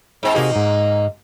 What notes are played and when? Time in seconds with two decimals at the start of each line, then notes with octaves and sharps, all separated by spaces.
0.23 G#2 C4
0.35 C3 A#3 D#4 F#4 G#4
0.56 G#2